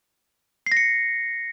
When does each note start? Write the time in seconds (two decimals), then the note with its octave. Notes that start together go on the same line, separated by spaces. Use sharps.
0.66 C7
0.72 A#6
0.77 C#7